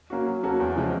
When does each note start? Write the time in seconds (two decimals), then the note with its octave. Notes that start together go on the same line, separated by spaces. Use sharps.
0.10 A#3 C#4 F#4
0.26 F#3
0.43 A#3 C#4 F#4 A4
0.60 E2
0.76 C#3 F3 G#3 C4